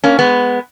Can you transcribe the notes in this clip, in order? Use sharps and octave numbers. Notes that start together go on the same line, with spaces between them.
A#3 C#4
G#3 B3